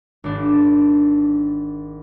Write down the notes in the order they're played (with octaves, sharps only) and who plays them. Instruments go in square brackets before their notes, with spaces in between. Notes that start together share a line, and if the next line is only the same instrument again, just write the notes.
[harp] G#1 D4